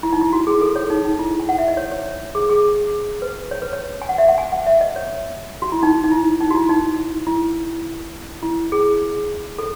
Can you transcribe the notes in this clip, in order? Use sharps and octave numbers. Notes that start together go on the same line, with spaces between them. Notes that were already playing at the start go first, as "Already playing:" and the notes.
E4
D#4
E4
F#4
G#4
A4
C#5
D#4
D#4
E4
G#5
F#5
E5
D#5
C#5
C#5
C#5
G#4
G#4
G#4
B4
C#5
B4
C#5
G#5
F#5
E5
F#5
G#5
F#5
E5
D#5
C#5
F#4
E4
D#4
D#4
E4
D#4
F#4
E4
D#4
E4
E4
G#4
A4